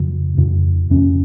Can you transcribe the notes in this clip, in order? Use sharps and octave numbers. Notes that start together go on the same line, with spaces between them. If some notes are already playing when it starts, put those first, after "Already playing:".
Already playing: F2 C#3
F2 C#3
F2 C#3 C#4